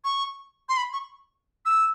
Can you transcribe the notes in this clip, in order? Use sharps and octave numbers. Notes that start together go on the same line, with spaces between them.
C#6
C6
B5
C#6
E6